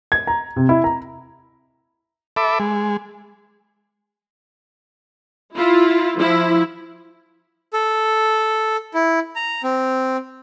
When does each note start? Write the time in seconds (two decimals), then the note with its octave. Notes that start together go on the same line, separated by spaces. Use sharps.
0.12 G#6
0.27 A#5
0.56 C3
0.69 E4
0.84 A#5
2.36 A4 E5 B5 D6
2.59 G#3
5.57 E4 F4
6.19 F3 E4
7.73 A4
8.94 E4
9.36 A#5
9.63 C4